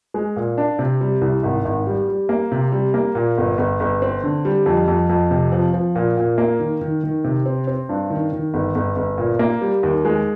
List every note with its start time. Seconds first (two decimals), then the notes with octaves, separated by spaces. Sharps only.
0.14 G#3
0.36 A#2
0.58 D4
0.79 C3
1.01 G3
1.21 C2
1.43 G#1
1.65 G#1
1.87 G3
2.08 G3
2.29 A#3
2.52 C3
2.72 G3
2.94 A#3
3.15 A#2
3.38 G1
3.58 G1
3.80 G1
4.02 C4
4.24 D3
4.45 G3
4.66 F2
4.88 F2
5.09 F2
5.31 C3
5.52 F3
5.73 F3
5.95 A#2
6.17 A#2
6.38 A#3
6.60 D#3
6.81 D#3
7.04 D#3
7.24 C3
7.46 C4
7.67 C4
7.89 G2
8.10 D#3
8.33 D#3
8.54 G1
8.75 G1
8.96 G1
9.18 A#2
9.39 A#3
9.61 G3
9.83 D#2
10.05 G#3